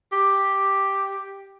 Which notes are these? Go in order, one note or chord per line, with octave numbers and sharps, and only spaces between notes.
G4